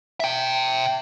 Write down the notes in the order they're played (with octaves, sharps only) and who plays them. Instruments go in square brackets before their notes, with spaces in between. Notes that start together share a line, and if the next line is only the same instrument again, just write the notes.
[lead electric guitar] E5 G5